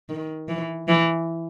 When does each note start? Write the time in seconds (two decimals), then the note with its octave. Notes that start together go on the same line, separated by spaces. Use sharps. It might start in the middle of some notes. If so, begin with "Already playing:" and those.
0.09 D#3
0.49 E3
0.88 E3